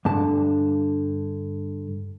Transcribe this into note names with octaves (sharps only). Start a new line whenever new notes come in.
G2 D3 A5